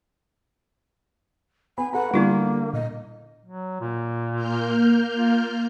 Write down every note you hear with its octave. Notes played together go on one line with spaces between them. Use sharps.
B3 G#5 B5
A4 B4 F#5 A#5
D3 G3 A#3 B3 E4 F4
A#2 D#5
F#3
A#2
A#3 F6 G6
F4